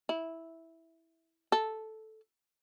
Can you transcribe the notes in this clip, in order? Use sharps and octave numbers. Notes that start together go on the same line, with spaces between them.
E4
A4